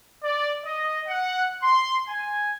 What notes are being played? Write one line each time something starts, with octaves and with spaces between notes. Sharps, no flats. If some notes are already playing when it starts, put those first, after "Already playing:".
D5
D#5
F#5
C6
G#5